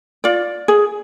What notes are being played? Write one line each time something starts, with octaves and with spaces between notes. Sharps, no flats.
F4 D5
G#4